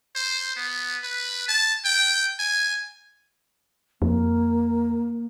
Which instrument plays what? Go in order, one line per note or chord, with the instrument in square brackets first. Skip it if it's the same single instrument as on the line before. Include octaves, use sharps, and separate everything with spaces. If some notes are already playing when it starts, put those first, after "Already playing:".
[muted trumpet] C5
B3
B4
A5
G5
G#5
[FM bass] F2 [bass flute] A#3